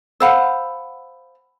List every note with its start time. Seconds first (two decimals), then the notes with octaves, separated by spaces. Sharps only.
0.20 C5 F5 F#5 G#5 B5 E6